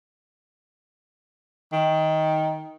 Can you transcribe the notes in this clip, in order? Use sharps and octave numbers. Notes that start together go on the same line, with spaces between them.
D#3